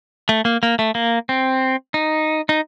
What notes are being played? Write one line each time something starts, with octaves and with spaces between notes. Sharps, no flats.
A3
A#3
A#3
A3
A#3
C4
D#4
D#4